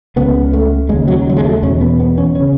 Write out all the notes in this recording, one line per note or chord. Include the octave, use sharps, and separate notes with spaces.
C#2 C#3 B3
A3
D#2 C#3 G#3
F#3
F#3
G#3
A3
E2 B2 C#4
B3
B3
C#4
C#3 C#4